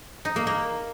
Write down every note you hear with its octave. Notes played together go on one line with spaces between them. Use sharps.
D#4
A#3
A#3